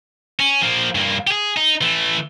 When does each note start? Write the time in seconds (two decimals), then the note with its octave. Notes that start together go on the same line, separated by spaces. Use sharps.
0.40 C#4
0.61 F3 A#3
0.95 G2 A#3
1.27 G4 G#4
1.57 D#4
1.81 E3 A3